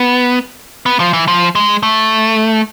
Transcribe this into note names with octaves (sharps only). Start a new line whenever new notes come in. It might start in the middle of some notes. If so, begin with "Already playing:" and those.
Already playing: B3
B3
F3
E3
F3
G#3
A3